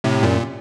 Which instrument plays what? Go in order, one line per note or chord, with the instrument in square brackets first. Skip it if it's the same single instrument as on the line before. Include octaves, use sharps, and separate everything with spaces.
[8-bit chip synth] A2 C3
F#2 A#2